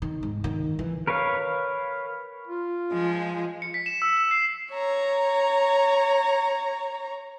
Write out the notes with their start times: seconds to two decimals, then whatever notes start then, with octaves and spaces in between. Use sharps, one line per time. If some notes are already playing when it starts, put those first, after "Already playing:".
0.02 D#3
0.23 G#2
0.44 D#3
0.79 E3
1.07 A#4 B4 C#5 F5
2.47 F4
2.91 F3 G#3
3.62 C#7
3.74 B6
3.86 E7
4.02 E6
4.17 E6
4.31 C7
4.72 C#5 A#5